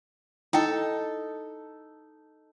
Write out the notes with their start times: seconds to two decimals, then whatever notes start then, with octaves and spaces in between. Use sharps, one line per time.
0.53 D#4 E4 A4 G5